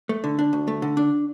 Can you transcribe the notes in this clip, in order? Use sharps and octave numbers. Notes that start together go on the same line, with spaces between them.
A3
D3
D4
D2
A3
D3
D4